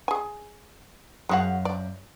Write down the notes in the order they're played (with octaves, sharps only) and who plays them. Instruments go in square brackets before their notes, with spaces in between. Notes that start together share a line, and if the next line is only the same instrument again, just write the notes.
[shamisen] G#4 G#5
[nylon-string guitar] F#2 F5 [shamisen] G#3 F#4 F#5
[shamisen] D5